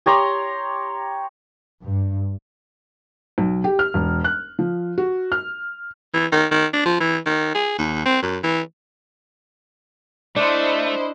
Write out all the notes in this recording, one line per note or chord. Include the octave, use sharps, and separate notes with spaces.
G4 C#5 A#5 C6
G2
B1
G4
F6
E1
F#6
F3
F#4
F6
E3
D#3
D#3
D4
F3
E3
D#3
G#4
D#2
C4
F#2
E3
A3 D4 E4 C5 D#5